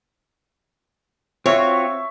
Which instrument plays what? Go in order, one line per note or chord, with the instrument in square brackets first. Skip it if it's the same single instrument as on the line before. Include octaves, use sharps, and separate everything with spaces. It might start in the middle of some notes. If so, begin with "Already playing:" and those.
[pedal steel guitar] C4 F4 F#4 [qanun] C#5 [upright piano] E5 C#6